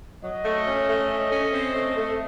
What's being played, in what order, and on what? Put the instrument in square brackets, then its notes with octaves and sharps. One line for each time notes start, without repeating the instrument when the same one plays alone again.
[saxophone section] F#3 [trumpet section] D#5
[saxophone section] A3
C#4
A3
C#4
C#4
C4
A3
A3